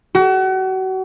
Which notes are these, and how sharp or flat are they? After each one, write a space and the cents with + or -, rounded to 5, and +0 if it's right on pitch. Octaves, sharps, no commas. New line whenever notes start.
F#4 +35